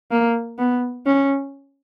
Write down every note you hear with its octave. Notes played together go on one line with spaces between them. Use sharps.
A#3
B3
C#4